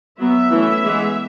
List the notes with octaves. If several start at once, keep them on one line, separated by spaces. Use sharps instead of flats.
F#3 B3 E5
E3 A3 C#4
E3 G#3 B3